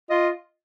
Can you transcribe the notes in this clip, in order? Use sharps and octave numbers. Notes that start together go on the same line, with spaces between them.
F4 D#5